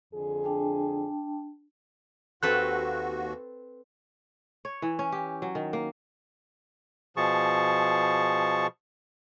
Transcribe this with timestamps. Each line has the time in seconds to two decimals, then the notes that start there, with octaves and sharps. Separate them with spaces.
0.14 F2 D3 G#4
0.44 D4 G5 A5
2.43 D#2 C4 F#4 A4 B4 F#6
4.65 C#5
4.82 E3
4.99 C#4
5.12 G4
5.42 F#3
5.55 D#3
5.73 A#3
7.17 B2 F3 G#4 A5 C#6